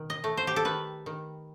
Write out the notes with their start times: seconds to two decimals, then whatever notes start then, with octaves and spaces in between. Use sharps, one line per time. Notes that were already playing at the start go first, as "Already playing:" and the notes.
Already playing: B2 D#3
0.10 D#5
0.24 A3
0.37 C5
0.47 G4
0.56 A4
0.65 D#3 B4
1.06 D#3